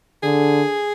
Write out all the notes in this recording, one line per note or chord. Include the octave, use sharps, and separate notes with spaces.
D3 G#4